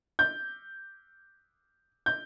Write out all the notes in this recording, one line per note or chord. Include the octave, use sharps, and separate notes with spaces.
G6
G6